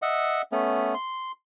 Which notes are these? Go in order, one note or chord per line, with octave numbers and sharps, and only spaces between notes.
D#5 E5 F#5
A3 B3 C#4
C6